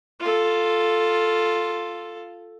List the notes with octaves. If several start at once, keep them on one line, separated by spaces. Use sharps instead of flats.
F4 A4